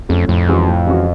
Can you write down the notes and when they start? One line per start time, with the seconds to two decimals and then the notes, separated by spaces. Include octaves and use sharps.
0.09 F2 F3 A3 C#4
0.28 F2 A2
0.48 E3 G#3 C#4 F#4
0.68 A2
0.86 E3 G#3 C#4 F#4